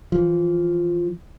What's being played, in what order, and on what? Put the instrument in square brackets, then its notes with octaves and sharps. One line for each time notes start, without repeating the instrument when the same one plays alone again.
[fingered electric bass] E3 F3